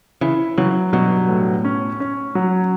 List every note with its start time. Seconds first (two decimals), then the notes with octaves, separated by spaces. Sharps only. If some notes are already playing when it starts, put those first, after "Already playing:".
0.21 C#3 E3 E4
0.57 C#3 E3 F#3
0.93 G2 B2 F#3
1.29 A2
1.65 C#4
2.00 C#4
2.35 F#3